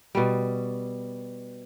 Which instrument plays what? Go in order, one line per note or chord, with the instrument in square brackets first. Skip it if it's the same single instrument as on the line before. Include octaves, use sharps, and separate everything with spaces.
[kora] B2 G3